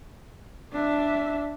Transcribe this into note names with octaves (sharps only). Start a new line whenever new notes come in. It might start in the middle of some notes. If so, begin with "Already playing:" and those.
D4 E5